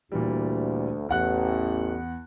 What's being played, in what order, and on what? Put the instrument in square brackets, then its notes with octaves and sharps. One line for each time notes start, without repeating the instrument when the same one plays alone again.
[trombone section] D2 [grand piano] A#2 E3 G3
[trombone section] A1 [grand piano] E2 F#5 F#6